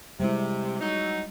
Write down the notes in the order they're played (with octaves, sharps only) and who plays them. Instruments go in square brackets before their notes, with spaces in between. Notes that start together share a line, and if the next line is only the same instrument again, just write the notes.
[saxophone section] C3 [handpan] G3 G#3 E4
[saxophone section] F#3 D#4